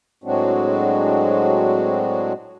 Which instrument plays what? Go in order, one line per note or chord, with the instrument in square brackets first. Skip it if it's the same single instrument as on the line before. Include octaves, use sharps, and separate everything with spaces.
[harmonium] A2 F#3 G#3 C4 D4 F#4